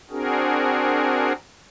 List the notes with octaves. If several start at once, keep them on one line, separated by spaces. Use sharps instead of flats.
C4 D4 F#4 G#4 A#4